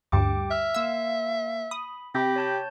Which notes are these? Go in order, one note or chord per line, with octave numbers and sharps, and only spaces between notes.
D2 G2 G4 G5 D6
E5 E6 F6
A#3 F5 E6
B5 D#6
C3 G4 G5 B5 A#6
C#5 A5 G6